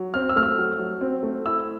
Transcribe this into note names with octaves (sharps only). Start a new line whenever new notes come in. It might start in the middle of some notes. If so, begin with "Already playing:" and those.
Already playing: F#3
C4 F6
E6
A3 F6
E6
F#3
F#3
C4
A3
E4 E6